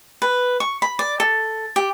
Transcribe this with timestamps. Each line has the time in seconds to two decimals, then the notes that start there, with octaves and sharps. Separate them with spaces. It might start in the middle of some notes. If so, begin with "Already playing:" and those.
0.22 B4
0.60 C#6
0.82 B5
0.99 D5
1.20 A4
1.76 G4